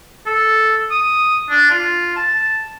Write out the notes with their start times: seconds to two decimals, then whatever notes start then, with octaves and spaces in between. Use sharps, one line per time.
0.26 A4
0.91 D#6
1.50 D4
1.70 F4
2.16 A5